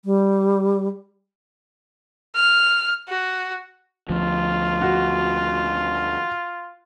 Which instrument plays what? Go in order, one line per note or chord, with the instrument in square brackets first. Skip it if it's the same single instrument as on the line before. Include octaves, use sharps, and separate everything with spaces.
[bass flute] G3
[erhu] F6
F#4
[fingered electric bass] D2 F3 [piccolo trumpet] F4
[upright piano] F#4